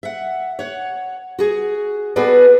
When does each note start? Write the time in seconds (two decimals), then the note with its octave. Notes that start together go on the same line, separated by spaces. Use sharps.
0.03 E5 F#5
0.59 C#5 F#5
1.39 F#4 G#4
2.16 B3 F#4 G#4 A4 B4 D5